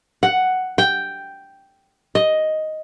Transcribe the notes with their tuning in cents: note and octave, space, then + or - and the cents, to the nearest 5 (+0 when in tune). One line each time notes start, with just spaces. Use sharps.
F#5 +5
G5 +0
D#5 +5